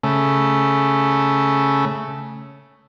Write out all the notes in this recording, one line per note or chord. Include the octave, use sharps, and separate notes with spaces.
C#3 A3